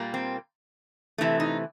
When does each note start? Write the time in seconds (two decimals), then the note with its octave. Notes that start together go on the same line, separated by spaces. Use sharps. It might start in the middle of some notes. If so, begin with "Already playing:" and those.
Already playing: A#2 G3 A#3
0.14 C4
1.18 C3 E3 A3
1.40 D#4